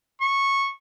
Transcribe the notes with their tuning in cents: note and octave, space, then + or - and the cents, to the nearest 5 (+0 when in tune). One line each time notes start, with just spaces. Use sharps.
C#6 -10